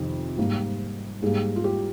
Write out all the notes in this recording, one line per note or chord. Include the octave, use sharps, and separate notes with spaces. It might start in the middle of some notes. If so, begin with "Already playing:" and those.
Already playing: F2 C3 D#3
G#2 G3 A#3
G#2 G3 A#3 G#4
F4
G4